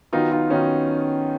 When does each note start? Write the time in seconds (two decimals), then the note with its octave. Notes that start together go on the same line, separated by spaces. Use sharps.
0.12 D#3 F#3 B3 D#4 F4
0.32 D#4 F4
0.50 D#3 F#3 B3 C#4 D#4